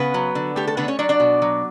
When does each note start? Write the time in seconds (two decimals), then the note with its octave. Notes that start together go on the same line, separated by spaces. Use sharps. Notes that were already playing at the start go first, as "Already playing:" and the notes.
Already playing: C#3 B3 B4
0.14 F#3
0.35 D3
0.56 A3 G4
0.67 A4
0.77 D3 B3 B4
0.88 C#4 C#5
0.99 F#3 D4 D5
1.09 D4 D5
1.20 B2
1.42 F#3